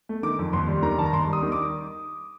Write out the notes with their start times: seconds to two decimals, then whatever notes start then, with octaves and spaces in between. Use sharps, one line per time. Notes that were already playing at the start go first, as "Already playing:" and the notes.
0.09 A3
0.23 D#3 D6
0.39 F2
0.53 D#2 C6
0.68 G3
0.82 D#3 A#5
0.98 D#2 A5
1.06 A#5
1.13 D#2 C6
1.27 G3
1.33 D#6
1.43 D#3
1.52 D6